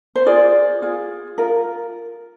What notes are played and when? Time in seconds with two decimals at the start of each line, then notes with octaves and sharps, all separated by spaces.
0.16 C5
0.26 F4 G#4 D5
0.82 F4 G#4
1.38 F4 A#4